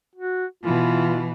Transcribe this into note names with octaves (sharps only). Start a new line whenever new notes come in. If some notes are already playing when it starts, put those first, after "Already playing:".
F#4
B2 E3 F4